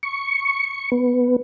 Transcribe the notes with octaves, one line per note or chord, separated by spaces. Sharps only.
C#6
B3